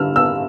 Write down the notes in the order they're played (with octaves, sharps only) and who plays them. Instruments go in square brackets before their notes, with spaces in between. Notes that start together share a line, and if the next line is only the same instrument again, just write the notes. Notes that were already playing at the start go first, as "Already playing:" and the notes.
Already playing: [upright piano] D3 G3 E6 F6
E6